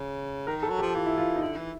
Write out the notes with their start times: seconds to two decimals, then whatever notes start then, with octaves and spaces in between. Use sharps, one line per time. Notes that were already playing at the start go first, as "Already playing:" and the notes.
Already playing: C#3
0.47 D#3 A#4
0.63 A4
0.70 F#3
0.79 G4
0.82 F3
0.94 E3 F4
1.06 E4
1.18 F4
1.36 D#4
1.42 D3 E4
1.57 E3